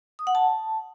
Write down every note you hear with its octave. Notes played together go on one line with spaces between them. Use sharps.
D#6
F#5
A5